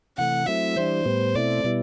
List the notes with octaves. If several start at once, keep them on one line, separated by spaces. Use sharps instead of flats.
C3 E3 A3 F#5
F#3 A3 C4 E4 E5
E3 G3 D4 C5
A2 G3 B3
B2 A3 C4 E4 D5
B2 G3 B3 E4